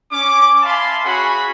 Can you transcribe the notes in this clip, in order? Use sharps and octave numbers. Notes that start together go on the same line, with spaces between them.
C#4 D6
E5 F5 G#5 A5 B5 C6
C#4 F#4 G#4 F#5 B5